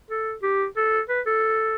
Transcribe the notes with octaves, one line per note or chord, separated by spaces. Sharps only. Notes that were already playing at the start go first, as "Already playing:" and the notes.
A4
G4
A4
B4
A4